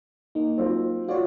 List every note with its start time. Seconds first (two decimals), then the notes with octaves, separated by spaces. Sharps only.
0.35 A#3 D#4
0.57 F#3 C4 F4
1.08 F4 F#4 C#5 D5